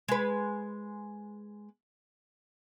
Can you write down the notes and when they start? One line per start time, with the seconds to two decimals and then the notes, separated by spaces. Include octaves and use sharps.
0.08 G#3 B4